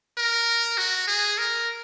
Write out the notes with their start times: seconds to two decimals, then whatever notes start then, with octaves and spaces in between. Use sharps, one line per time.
0.18 A#4
0.77 F#4
1.07 G#4
1.38 A#4